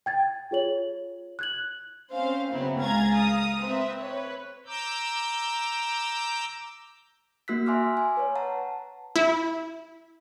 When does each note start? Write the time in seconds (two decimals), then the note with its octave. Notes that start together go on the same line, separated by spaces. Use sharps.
0.06 G5 G#6 A6
0.51 F4 G#4 C#5 F#7
1.39 F#6 G#6 F#7
2.13 C4 C#4 C5 F5
2.52 C#3 F#3 B3 C4 E4
2.81 C#2 G#4 F5 A#5 G#6 A6
3.16 F5 A#5 D#6
3.62 C4 B4 E5
4.01 B4 C#5
4.66 A#5 D6 E6 G6
7.48 A#3 F#4 E6 F#6 B6
7.66 E5 G#5 C6 D6 E6 F6
7.97 G#5
8.17 B4 C#5
8.35 F#5 A5 A#5
9.16 E4